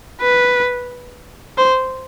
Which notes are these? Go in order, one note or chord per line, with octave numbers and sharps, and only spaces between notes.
B4
C5